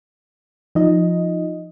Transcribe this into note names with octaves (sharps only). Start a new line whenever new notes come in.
F3 D#4 D#5